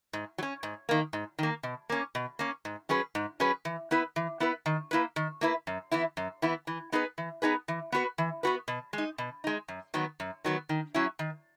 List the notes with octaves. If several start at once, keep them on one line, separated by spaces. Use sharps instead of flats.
G#2
F#3
C#4
G#2
D#3 A#3
G#2
D#3 A#3
B2
A#3 C#4
B2
A#3 C#4
G#2
F#3 C#4 G#4 B4
G#2
F#3 C#4 G#4 B4
E3
B3 E4 B4
E3
B3 E4 B4
D#3
A#3 E4 B4
D#3
A#3 E4 B4
F#2
E3 B3 E4
F#2
E3 B3 E4
E3
B3 D#4 G#4 B4
E3
B3 D#4 G#4 B4
E3
B3 F#4 B4
E3
B3 F#4 B4
B2
G#3
D#4
B2
G#3 D#4
F#2
D#3 F#3 B3
F#2
D#3 F#3 B3
D#3
F#3 C#4 E4
D#3